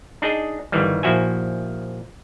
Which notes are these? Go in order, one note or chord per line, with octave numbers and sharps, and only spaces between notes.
D4 D#4 G#4 D#5
G1 D#3 E3 G3
A#1 F3 E4 F#4 E5 G#5